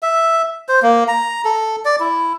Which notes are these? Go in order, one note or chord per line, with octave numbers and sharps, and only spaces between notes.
E5
C5
A#3
A#5
A4
D5
E4